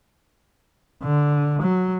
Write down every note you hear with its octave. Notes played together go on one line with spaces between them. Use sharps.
D3
F#3